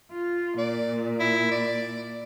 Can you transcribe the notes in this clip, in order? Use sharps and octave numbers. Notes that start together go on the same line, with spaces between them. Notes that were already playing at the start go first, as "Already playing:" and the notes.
F4
A#2 D5
E4
D5